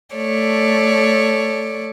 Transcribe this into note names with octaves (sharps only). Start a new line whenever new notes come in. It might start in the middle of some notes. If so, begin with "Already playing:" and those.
A3 A4 C#5 D5